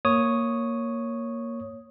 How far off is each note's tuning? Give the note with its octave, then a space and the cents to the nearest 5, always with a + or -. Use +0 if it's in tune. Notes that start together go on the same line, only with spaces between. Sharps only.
A#3 +0 C#5 +0 D#6 +0